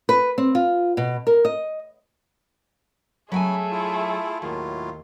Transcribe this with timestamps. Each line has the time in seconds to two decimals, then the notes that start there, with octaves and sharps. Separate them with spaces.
0.09 B4
0.38 C4
0.55 F4
0.97 B2
1.27 A#4
1.45 D#5
3.32 C#3 F#3 A3 G#4 G5 G#5 B5
3.71 E4 F4
4.42 D#2 A2 F#3 F4